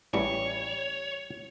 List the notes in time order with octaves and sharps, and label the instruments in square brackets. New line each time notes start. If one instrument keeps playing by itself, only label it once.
[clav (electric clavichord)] A1 E3 G3 [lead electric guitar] C#5